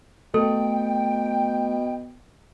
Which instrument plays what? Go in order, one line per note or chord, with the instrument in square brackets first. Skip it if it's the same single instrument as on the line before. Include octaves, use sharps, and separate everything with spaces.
[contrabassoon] B2 [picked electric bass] A3 [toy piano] A4 [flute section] G5